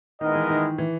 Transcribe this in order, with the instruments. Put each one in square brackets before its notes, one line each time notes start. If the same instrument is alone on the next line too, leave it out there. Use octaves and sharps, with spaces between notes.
[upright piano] D#3 [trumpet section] G#3 B3 E4 A#4 D#5
[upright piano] E3
D#3
E3